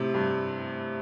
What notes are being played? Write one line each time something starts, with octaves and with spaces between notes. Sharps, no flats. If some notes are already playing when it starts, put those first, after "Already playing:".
Already playing: A2 C3
G2